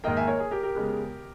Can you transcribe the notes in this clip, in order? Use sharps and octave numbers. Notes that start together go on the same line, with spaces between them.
G#2 D#3 A#3 D#5 G5
E5 G#5
A#4 C#5
G#4
G4 A#4
G4 A#4
C#3 G#3 B3